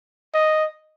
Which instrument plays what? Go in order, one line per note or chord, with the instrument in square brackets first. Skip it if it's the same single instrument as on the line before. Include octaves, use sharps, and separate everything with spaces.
[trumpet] D#5